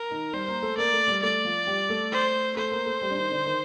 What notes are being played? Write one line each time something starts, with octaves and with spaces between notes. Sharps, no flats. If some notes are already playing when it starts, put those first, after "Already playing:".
Already playing: A#4
D#3 D#4
G3 G4 C5
A#3 A#4
A3 A4
A#3 A#4 D5
A3 A4
G3 G4
A3 A4 D5
F3 F4
G3 G4
A3 A4
C5
A3 A4 C5
A#3 A#4
A3 A4
G3 G4
D4
D#3 D#4
D3 D4
D#3 D#4